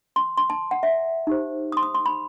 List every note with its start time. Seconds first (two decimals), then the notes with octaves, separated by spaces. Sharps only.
0.16 C6
0.37 C6
0.50 A5
0.71 F#5
0.83 E5
1.27 D#4 G4 C5
1.72 D#6
1.77 C6
1.83 D#6
1.95 C6
2.06 B5